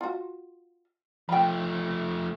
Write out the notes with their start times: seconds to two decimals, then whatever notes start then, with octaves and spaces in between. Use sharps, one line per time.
0.01 F4 F#4
1.29 F3 A3 G5 B5